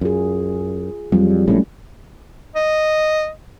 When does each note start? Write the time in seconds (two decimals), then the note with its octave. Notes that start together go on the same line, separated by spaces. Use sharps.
0.01 F#2 F4 G#4
1.12 F2 F#3 G3 F4
1.48 A#1 A2 A3 C#4
2.55 D#5